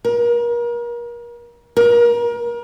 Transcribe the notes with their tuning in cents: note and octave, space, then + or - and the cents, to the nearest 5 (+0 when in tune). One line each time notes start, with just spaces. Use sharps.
A#4 +35
A#4 +30